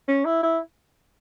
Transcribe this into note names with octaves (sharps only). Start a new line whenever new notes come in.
C#4
E4
E4